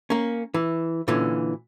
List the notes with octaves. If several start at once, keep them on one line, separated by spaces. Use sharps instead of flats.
A#3 C#4
E3
A#2 D3 E3 C#4